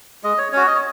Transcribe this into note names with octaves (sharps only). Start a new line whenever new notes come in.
G#3 D#5
C#5
C#4 F#4 C#5
D#5
C#5